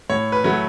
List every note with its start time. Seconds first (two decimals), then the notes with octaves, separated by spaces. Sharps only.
0.10 A2 C#5
0.32 B4
0.44 F#3 A3